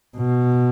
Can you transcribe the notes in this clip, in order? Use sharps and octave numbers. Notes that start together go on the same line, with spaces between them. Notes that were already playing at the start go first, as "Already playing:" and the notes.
B2